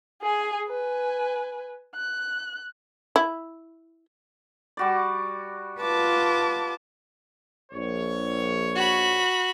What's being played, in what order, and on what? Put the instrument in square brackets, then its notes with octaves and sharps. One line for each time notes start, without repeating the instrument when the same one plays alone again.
[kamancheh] G#4 G#5
B4 G#5
F#6
[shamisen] E4
[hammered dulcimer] G3 F#4 D5
[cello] F4 B4 [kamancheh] A5 D6
[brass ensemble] A#1 C#5
[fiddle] F#4 B5